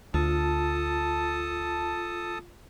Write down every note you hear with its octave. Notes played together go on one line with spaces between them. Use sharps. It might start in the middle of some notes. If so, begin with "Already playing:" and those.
D2 F4 A4 A5 D#6